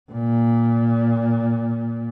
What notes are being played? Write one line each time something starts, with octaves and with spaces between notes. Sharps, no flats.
A#2